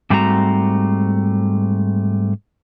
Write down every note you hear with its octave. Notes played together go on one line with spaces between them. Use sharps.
G#2 G3 A3 C4 F#4 A#5